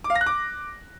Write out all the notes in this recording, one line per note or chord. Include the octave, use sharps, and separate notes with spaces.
D6
F5
A#6
F#6
D6